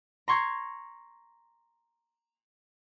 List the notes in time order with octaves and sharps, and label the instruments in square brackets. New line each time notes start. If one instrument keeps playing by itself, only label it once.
[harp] A#5 C6 C#6 G#6